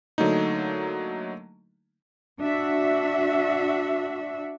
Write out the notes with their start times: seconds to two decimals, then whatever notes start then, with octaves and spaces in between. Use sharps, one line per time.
0.18 D3 F#3 A3 A#3 D#4
2.41 D4 F#4 E5